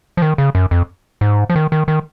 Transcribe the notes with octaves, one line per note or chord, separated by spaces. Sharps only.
F3
D#3
C#3
F#2
F2
G#2
F3
D#3
D#3
D#3